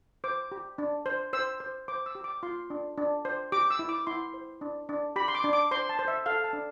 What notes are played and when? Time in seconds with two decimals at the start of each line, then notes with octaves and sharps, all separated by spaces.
0.24 C5 D6
0.52 G4
0.78 D4
1.06 C5
1.33 C5 E6
1.60 C5
1.88 C5 D6
2.06 E6
2.15 G4
2.24 D6
2.43 F4 C6
2.70 D4
2.98 D4
3.25 C5
3.52 G4 D6
3.70 E6
3.79 E4
3.89 D6
4.07 E4 C6
4.34 C5
4.61 D4
4.89 D4
5.16 G4 B5
5.28 C6
5.35 D6
5.44 D4
5.53 D6
5.71 C5 C6
5.89 A5
5.99 C5
6.08 E5
6.26 A4 F5
6.44 A5
6.53 D4